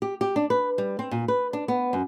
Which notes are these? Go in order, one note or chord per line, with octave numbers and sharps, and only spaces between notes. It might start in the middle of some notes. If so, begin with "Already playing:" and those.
G4
G4
D4
B4
G3
C4
A#2
B4
D4
B3
F#2